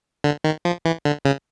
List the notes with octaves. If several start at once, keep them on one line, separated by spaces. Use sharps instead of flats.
D3
D#3
F3
E3
D3
C#3